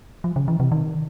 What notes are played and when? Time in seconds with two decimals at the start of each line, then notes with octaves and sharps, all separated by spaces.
0.24 F3
0.36 C#3
0.48 E3
0.60 C3
0.72 D#3